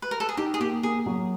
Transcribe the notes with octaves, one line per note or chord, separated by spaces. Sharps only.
B4
A#4
A4
G#4
D#4 G4
G#4
A#3 G4
A#3 G#4
F#3